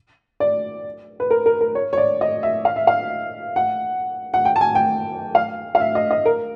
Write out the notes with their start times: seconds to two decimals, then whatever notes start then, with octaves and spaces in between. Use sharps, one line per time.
0.40 D5
1.20 B4
1.30 A#4
1.46 A#4
1.61 A#4
1.75 C#5
1.93 C#5
1.97 D5
2.21 D#5
2.43 E5
2.65 F5
2.76 E5
2.87 F5
3.56 F#5
4.34 F#5
4.45 G5
4.56 A5
4.61 G#5
4.75 G5
5.35 F5
5.75 F5
5.80 E5
5.95 D#5
6.11 D#5
6.25 A#4